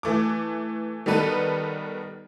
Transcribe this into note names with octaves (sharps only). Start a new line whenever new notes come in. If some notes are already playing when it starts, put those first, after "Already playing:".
E3 A3 D6
D#3 G3 B3 A4 B4